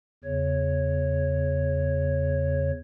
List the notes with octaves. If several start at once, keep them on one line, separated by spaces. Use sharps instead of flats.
E2 C#3 C#5